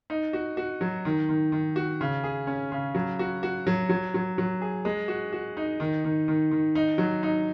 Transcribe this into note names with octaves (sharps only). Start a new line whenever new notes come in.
D#4
F#4
F#4
F#3
D#3
D#3
D#3
F#4
C#3
G#4
C#4
C#3
F#3
F#4
F#4
F#3
F#3
F#3
F#3
G#4
G#3
F#4
F#4
D#4
D#3
D#3
D#3
D#3
D#4
F#3
D#4